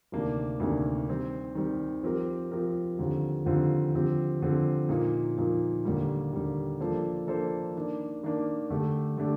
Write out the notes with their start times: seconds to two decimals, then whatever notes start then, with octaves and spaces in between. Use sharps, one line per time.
0.12 D2 C3 D#3 A#3 D4
0.60 D2 C3 D#3 A#3 D4
1.08 D#3 G3 C4
1.55 D#3 G3 C4
2.03 F3 C4 G4 A#4
2.51 F3 C4 G4 A#4
2.99 D#2 D3 F3 C4 F4
3.46 D#2 D3 F3 C4 F4
3.95 D3 F3 C4 G4
4.42 D3 F3 C4 G4
4.89 A#2 F3 A#3 D#4
5.38 A#2 F3 A#3 D#4
5.85 D#2 D3 G3 A#3
6.33 D#2 D3 G3 A#3
6.80 F3 A#3 D4 A4 C5
7.27 F3 A#3 D4 A4 C5
7.76 D#3 A#3 D4
8.23 D#3 A#3 D4
8.70 D3 A3 D4 G4
9.18 D3 A3 D4 G4